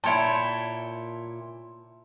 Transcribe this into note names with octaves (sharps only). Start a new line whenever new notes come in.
A#2 E4 C#5 E5 G5 A5